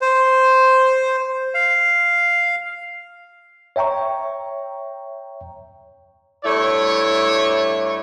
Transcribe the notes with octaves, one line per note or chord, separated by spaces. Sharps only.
C5
F5
C#5 E5 G5 A#5 C#6
G2 A3 E4 C#5